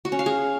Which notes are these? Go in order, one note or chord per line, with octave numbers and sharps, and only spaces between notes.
F#4
C#4
F5
G#4